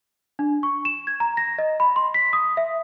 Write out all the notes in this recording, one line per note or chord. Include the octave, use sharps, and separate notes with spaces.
D4
C#6
E7
G#6
A#5
A#6
D#5
B5
C6
B6
D#6
E5